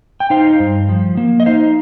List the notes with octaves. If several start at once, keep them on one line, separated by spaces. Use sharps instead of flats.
G5
D#4 C5 F5
G2
F3
A#3
D#5
D#4 C5 F5